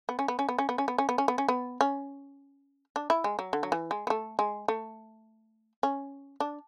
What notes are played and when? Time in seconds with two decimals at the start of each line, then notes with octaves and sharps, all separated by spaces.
0.09 B3
0.19 C#4
0.28 B3
0.39 C#4
0.49 B3
0.59 C#4
0.69 B3
0.78 C#4
0.88 B3
0.98 C#4
1.09 B3
1.18 C#4
1.28 B3
1.38 C#4
1.48 B3
1.81 C#4
2.96 D4
3.10 E4
3.24 G#3
3.39 F#3
3.53 D3
3.63 F#3
3.72 E3
3.91 G#3
4.07 B3
4.10 A3
4.39 G#3
4.68 A3
5.83 C#4
6.40 D4